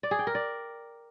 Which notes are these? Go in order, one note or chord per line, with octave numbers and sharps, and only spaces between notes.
D5
G#4
G5
A#4
D5